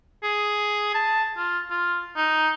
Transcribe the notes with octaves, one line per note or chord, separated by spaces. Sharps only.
G#4
A5
F4
F4
D#4